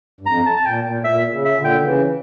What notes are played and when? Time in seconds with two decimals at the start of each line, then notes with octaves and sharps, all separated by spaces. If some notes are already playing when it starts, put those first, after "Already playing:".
0.21 G2
0.26 F2 A#5
0.46 A5
0.56 A5
0.66 A#2 G5
0.85 A#2
0.99 A2
1.04 A#2 E5
1.31 C#3
1.45 E5
1.57 A#2 D3
1.64 G5
1.83 C#3 E3